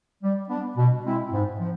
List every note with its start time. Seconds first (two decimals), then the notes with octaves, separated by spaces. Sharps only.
0.23 G3
0.49 B3 D4
0.77 B2
1.05 G#3 C4 E4
1.32 G#2
1.60 F3